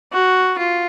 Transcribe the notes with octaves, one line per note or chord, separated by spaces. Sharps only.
F#4
F4